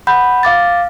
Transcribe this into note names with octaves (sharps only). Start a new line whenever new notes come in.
F#5 B5 G6
F5 D6 A6